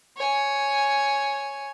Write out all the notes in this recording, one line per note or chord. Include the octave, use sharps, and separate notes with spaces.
C#5 G#5